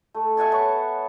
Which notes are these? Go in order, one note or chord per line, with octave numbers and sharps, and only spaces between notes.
A3
E5 F#5 G#5 A5
B3 C#5 A5 C#6